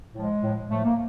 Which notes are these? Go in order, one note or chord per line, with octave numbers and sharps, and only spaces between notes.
A2 F3 G#3
A2 F3
A2 F3 A3
A#3